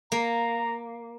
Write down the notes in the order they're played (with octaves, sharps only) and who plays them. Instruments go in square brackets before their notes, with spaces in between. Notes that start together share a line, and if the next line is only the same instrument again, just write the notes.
[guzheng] A#3 [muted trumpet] A#5